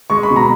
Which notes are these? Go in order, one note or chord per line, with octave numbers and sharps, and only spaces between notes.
G#3 C#6
B5
B2
A#5